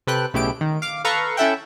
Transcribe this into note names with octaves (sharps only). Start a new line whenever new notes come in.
C3 A4 B4 G5 F#6
B1 A2 C#3 E4 G4 D7
D#3
F5 D6
A4 B4 F5 A#5 C#6
C#4 E4 A4 E5 F#5 G5